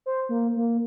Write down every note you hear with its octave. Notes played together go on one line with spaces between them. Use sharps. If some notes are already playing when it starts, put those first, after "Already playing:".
C5
A#3
A#3